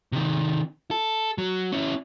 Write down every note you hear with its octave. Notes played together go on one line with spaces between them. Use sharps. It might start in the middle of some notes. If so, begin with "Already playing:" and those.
C3 D#3
A4
F#3
C#4 E4